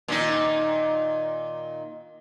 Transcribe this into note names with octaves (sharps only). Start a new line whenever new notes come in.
A#2 D#3 D#4